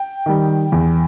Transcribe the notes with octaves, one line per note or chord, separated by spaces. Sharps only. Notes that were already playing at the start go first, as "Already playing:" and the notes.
Already playing: G5
D#3 G3
E2